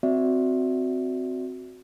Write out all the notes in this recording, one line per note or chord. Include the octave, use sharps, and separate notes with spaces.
C4 F#4 D5 E5